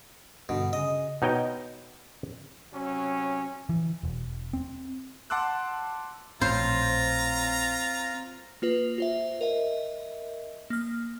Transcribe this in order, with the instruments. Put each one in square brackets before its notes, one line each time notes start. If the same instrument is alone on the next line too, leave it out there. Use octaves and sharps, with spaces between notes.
[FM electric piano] G2 D3 [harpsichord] B2
[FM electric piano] C#3 G#4 [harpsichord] D#5
[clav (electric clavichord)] B2 D#4 C#5 D#5 G5
[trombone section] C3 F#3 C#4
[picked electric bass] E3
E1
C4
[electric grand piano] F#5 A5 C6 D6 E6 F#6
[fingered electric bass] A#1 A2 [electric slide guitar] C4 C#5 [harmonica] F4 A#5 [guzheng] C5
[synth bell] A#3 F4 B4
F4 C5 E5
A#4 D#5 E5
A#3 F6